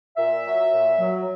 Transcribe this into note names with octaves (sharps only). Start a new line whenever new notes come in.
A#2 E5
F#3
A#2
F#3